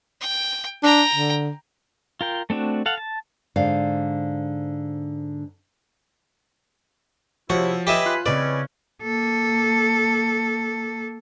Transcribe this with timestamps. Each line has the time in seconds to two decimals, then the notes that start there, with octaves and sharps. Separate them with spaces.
0.21 G5
0.83 D4 G5 A#5
1.15 D3
2.21 F4 A#4 G5
2.50 A3 C4 D4 F#4
2.86 A4 F5 F#5
2.98 A5
3.56 G#2 D3 C5 D5 F5
7.50 C3 F3 E4 F#4 C#5
7.87 G4 B4 D#5 E5 G#5 B5
8.06 F4 C6 F#6
8.26 C#3 E3 C4 C#4 B4 D5 D#5
9.03 A#3 A4